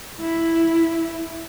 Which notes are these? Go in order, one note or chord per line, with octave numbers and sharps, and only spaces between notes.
E4